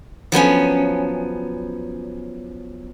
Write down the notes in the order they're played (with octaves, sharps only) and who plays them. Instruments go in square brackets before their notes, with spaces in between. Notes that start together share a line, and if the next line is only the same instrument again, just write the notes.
[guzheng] F3 F#3 B3 C#4